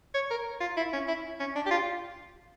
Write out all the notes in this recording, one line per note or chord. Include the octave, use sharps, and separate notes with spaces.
C#5
A#4
F4
E4
C#4
E4
C#4
D4
G4
F4